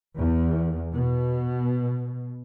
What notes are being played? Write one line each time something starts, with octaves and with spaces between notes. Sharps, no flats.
E2
B2